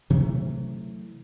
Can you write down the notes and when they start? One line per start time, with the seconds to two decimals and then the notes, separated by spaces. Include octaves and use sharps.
0.10 C3 E3 F#3 A3